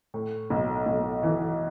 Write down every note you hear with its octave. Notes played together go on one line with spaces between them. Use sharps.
A2
B1
B1
E3